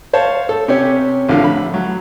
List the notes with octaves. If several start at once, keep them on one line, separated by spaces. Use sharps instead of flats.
C5 C#5 F5 A5
A4
C3 C#4 G4 C#5
A1 D3 F3 F5
B5
F#3